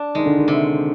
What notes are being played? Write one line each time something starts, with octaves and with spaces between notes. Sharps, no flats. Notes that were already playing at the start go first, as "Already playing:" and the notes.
Already playing: D4
D#3 G#3
D3
D#3
C3